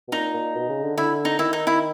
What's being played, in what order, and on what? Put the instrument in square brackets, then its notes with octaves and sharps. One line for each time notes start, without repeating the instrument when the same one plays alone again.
[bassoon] B2
[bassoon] A#2 [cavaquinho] D#4
[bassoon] A#2
B2
C#3
D3
[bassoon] D3 [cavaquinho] E4
[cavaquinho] D#4
[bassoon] D#3 [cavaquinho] E4
[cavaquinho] D#4
E4